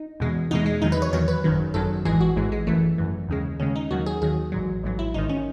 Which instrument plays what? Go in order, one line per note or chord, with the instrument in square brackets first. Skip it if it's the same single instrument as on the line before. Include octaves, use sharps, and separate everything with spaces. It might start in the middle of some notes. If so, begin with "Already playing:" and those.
Already playing: [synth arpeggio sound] D#4
E2 B2 G#3
E2 B2 G#3 D#4
G#3
E2 D#3 F#3 D#4
B4
C#5
E2 D#3 F#3 C#5
B4
G#1 F#2 D#3 F#3
G#1 F#2 D#3 F#3 A4
A1 G#2 E3 G#3 G#4
F#4
A1 G#2 E3 G#3
G#3
G#1 F#2 E3 A3
G#1 F#2 E3
D#2 C#3 G#3
D#2 C#3 G#3 C#4
D#4
D#2 D#3 F#3 F#4
G#4
D#2 D#3 F#3 G#4
A1 G#2 F#3
A1 G#2 F#3
E4
G#1 G#2 D#3 D#4
C#4